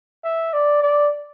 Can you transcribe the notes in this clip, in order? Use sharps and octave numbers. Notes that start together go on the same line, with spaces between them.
E5
D5
D5